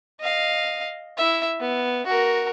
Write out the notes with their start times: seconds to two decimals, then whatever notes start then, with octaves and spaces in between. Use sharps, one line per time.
0.21 D#5 F5
1.17 E4 E5
1.60 B3
2.06 F#4 A#4